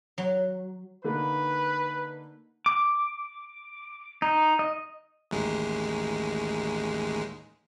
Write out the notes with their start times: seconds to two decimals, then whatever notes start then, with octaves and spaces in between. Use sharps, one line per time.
0.18 F#3
1.04 D3 A#3 D#4 B4
2.66 D6
4.22 D#4
4.59 D#5
5.31 A1 D#2 G#3